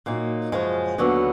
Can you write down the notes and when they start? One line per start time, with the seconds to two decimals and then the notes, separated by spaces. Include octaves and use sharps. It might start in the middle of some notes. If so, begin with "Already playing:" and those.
0.06 A#2 F#3 A#3 D#4
0.52 F#2 C#3 F3 G#3
0.98 D#2 D3 F#3 B3